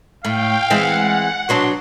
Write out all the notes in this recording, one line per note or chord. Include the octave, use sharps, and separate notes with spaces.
A2 F5 G5
E3 G#3 C4 F#5
B2 F#3 D4 C6